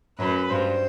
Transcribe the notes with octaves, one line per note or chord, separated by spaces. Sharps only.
F#2 B4
G2 C5